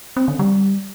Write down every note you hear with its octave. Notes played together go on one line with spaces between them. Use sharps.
C4
D3
G3